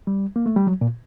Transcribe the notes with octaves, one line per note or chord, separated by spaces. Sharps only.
G3
A#3
A3
G3
F#3
A#2